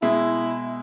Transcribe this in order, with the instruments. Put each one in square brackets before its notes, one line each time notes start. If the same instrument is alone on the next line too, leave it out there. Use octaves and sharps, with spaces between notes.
[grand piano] B2 G#3 E5 [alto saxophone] E4